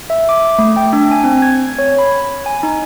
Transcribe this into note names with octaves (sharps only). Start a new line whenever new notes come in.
E5
D6
A3
G5
D4
G#5
C4
G#6
C#5
B5
G#5
D#4